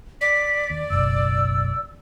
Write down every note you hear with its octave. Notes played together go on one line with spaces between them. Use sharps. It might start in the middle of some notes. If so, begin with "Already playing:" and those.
D5 B6
D#2
F#1 B1 E6